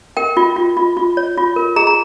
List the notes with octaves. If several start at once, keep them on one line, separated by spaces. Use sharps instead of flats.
A#4 G5
F4
F4
F4
F4
C#5
F4
A#4
G#4 A#5
A#5